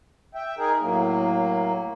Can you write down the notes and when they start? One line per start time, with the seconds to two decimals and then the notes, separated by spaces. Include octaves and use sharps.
0.35 E5 G5
0.58 D#4 G#4 A#4
0.81 A2 F#3 A#3